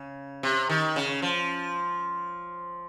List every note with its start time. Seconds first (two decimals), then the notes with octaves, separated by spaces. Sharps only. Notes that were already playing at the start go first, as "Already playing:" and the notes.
Already playing: C#3
0.43 C3
0.70 D#3
0.96 C#3
1.22 F3